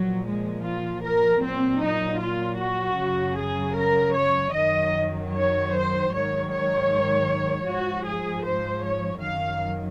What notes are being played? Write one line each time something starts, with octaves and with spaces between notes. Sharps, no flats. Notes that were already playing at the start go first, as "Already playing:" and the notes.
Already playing: A#2 F3 F#3
G#3
F4
A#4
A#2 F#3 C4
D#4
F4
F#4
F#2 C#3 F#3
G#4
A#4
C#5
F#2 D#3 F#3 D#5
C#5
C5
G#2 D#3 F#3 C#5
C#5
G#2 F3 F#4
G#4
C5
C#5
F#2 D#3 F#3 F5